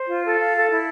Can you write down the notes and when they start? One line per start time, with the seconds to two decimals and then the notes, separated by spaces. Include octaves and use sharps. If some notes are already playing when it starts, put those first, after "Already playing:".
Already playing: C5
0.09 F4
0.25 A4
0.39 F5
0.55 A4
0.70 E4